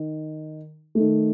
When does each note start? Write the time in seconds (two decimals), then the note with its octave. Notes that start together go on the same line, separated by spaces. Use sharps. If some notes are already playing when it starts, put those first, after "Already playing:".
Already playing: D#3
0.95 D#3 A3